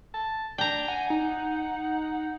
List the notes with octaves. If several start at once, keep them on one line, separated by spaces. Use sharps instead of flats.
A5
D4 G5 A#5
F#5 G#5
D#4